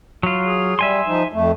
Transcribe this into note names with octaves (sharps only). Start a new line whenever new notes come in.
F#3 F4
G#4
G3 E5 G#5 C6
F3 D#4
F2 A3